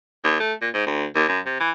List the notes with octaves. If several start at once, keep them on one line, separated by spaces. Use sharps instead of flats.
D#2
A3
A#2
G#2
D2
D#2
F#2
C3
E3